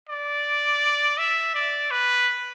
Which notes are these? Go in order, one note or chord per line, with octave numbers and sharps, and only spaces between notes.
D5
E5
D5
B4